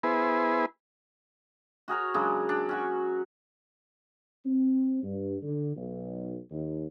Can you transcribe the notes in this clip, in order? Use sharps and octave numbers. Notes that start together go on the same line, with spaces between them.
B3 E4 G#4 B4 C5
F#4 G#4 A#4 C#5
C#3 F#3 G#3 D4
D4
C#4 F#4 C#6
C4
G2
D3
B1
D#2